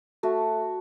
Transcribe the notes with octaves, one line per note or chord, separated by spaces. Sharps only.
A3 F#4